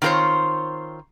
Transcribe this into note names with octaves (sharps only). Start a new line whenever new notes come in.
D#3 C4 F4 A#4 C5 C#5